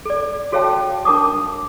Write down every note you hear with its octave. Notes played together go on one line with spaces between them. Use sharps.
A4 D5
F#4 A4 C#5 F5 G5 A5
D4 A#4 A5 D6 D#6